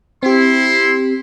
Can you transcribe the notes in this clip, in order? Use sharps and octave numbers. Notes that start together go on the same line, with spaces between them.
C4 E4 G4 C6